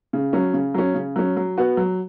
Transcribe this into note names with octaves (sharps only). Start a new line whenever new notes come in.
C#3
F#3 C#4
C#3
F#3 C#4
C#3
F#3 C#4
F#3
B3 F#4
F#3